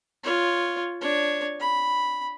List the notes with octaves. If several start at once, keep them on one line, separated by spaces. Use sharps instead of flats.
F4 C#5
D4 C#5
B5